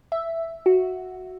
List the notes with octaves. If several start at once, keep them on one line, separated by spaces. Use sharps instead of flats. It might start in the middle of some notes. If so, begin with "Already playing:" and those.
E5
F#4